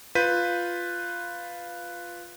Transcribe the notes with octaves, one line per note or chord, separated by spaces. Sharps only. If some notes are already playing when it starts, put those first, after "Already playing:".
F4 B4 G6 B6 D#7